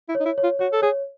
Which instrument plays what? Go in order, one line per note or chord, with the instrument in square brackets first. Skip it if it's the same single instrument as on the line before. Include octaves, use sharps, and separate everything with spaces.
[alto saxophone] E4
[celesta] C#5
[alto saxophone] D#4
E4
[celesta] C#5
[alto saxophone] F4
[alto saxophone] F#4 [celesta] C#5
[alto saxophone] A4
[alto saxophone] G#4 [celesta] C#5